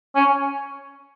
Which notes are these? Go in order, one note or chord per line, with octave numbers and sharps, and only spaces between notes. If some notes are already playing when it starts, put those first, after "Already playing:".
C#4